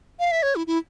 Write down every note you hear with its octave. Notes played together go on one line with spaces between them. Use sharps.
F5
E5
C#5
E4
E4